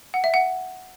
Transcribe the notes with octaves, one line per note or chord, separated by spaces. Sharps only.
F#5
E5
F#5